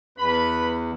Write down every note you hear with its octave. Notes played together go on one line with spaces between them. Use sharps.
E2 B4 B5